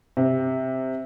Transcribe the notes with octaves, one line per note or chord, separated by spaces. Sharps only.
C3